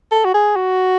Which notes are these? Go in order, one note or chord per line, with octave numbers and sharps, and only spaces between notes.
A4
F#4
G#4
F#4